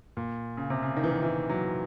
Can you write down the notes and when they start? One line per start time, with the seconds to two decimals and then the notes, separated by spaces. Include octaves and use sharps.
0.17 A#2
0.57 C#3
0.70 C3
0.83 C#3
0.97 D#3
1.04 E3
1.11 D#3
1.22 E3
1.49 F#3